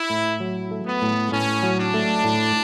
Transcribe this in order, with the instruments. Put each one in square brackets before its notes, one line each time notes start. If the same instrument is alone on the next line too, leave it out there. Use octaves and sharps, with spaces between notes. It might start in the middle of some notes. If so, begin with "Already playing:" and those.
Already playing: [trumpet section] E4
[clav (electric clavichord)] A2
F#3
A3
[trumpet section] B3
[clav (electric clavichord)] A2
[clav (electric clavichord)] A2 [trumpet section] C#4
[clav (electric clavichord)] F#3
[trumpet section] D4
[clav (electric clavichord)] A3
A2